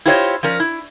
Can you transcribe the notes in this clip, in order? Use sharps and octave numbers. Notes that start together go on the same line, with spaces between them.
E4 F4 G4 C5 C#5 D#5
F3 C#4 A#4 D5
E4